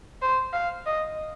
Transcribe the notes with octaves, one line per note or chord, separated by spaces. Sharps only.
C5
F5
D#5